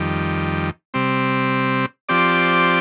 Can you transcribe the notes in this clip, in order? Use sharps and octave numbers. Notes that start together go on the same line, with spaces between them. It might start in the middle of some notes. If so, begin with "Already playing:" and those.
Already playing: F2 D#3 G3
C3 G3 C4
F3 C4 G4 D5